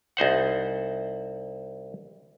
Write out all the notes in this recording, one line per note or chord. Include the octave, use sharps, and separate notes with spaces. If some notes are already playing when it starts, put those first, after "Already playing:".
C2 D#4 C5 F#5